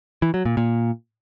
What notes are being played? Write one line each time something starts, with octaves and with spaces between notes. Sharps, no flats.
E3
F#3
A#2
A#2